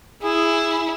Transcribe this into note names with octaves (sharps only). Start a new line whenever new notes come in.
E4 G#4